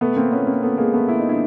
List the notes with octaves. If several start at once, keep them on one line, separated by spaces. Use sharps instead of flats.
B2 A3 B3
A#3 C4
B3 C#4
A#3 C4
A3 B3
G#3 A#3
A3 B3
E4
D#4
D4 E4